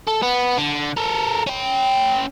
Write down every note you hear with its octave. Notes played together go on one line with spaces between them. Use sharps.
A4
B3
D3
A4 A#4
C#4 G5